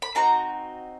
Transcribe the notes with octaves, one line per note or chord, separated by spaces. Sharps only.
B5
C4 D#4 F#4 A#5